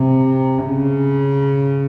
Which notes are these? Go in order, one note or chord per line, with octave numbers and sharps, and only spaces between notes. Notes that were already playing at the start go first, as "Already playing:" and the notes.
Already playing: C3
C#3